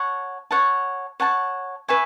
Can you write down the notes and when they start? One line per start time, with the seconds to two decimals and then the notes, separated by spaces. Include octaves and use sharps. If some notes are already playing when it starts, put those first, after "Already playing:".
Already playing: C#5 F#5 A5
0.51 C#5 F#5 A5
1.20 C#5 F#5 A5
1.88 B4 E5 G#5 C#6